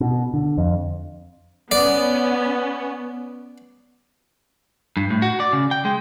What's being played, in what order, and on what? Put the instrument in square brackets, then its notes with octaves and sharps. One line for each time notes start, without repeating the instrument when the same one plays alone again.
[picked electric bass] B2
D3
F2
[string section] B3 C#4 [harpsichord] D5
[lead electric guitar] G2
A2
F#4
D5
C#3
G5
G#3